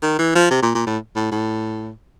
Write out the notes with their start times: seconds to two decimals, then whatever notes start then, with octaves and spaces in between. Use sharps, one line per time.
0.02 D#3
0.19 E3
0.35 F3
0.50 C3
0.62 A#2
0.75 A#2
0.87 A2
1.16 A2
1.32 A2